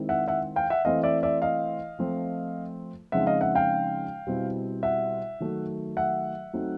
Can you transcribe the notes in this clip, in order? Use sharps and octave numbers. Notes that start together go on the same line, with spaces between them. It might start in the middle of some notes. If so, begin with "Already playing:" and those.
Already playing: D#3 G#3 C4 E4
E5 F#5
E5 F#5
F5 G5
E5 F#5
E3 A3 C4 E4 D#5 F5
D5 E5
D5 E5
D#5 F5
F3 A3 C4
C#3 F3 G#3 C4 D#4 E5 F#5
D#5 F5
E5 F#5
F5 G5
B2 G3 C4 E4
E5 F#5
D#3 F#3 A3
E5 F#5
F#3 A3 C4 D#4